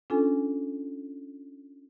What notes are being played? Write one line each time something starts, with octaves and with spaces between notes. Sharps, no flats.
C#4 D4 F4 A4 G#5